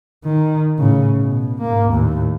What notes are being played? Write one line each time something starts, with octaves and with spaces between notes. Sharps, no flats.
D#3
A2 C#3
B2
G#2 A#3
D#2 A2